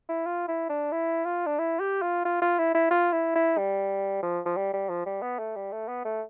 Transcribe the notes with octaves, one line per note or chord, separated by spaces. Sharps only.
E4
F4
E4
D4
E4
F4
D4
E4
G4
F4
F4
F4
E4
E4
F4
E4
E4
G3
F3
F3
G3
G3
F3
G3
B3
A3
G3
A3
B3
A3